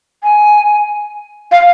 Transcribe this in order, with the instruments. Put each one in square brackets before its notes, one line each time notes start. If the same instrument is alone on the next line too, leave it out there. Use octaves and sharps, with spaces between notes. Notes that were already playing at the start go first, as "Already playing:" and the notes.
[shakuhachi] G#5
F5